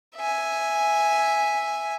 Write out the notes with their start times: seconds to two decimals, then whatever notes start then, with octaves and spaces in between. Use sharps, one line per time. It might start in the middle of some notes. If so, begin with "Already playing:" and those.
0.16 E5 G#5